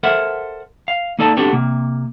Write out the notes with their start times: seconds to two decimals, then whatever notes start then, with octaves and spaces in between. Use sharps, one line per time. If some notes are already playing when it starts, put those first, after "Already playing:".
0.03 A4 A#4 C5 E5 F#5
0.88 F5
1.19 A#3 D#4 A4 D5 A5
1.37 B3 C4 D4 F#4 G4 A4
1.53 C3 A#3